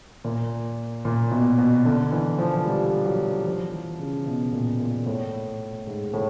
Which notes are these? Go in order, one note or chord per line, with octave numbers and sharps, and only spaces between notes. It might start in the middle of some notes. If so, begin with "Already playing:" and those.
A#2
A#2
B2
B2
D3
E3
F3
G3
F#3
F3
E3
C#3
B2
A#2
A#2
A2
G#2
A2